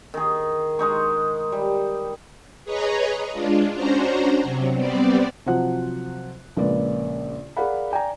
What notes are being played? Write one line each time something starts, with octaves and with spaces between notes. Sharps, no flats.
D#3 G#4
G#3 D#4 C#6
G3
G#4 B4 C#5 D#5 A#5
G#3 D4 F4
C#4 D4 F#4 C5 A#5
C3 F#3
G3 B3 C4 D5
C3 F3 F#3 C5 F#5 F#6
A#1 C#3 G#3 A#3 B4 D5
G#4 A#4 D5 F5 F#5 B5
D5 G5 G#5 A#5